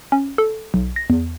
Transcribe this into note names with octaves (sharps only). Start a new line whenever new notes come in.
C#4
A4
B1
A#6
E2